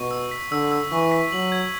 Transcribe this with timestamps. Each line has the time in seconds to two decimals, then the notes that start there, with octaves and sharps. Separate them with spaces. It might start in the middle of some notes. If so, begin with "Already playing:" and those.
Already playing: B2 C#6
0.11 E6
0.31 B6
0.51 D3 E6
0.72 E6
0.92 E3 C#6
1.12 B6
1.32 F#3 F#7
1.52 G#6